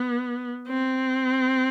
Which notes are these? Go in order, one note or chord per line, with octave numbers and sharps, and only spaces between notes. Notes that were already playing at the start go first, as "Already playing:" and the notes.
Already playing: B3
C4